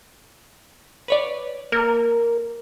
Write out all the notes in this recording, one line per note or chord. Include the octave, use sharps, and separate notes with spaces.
B4 C#5 D5
A#3 A#4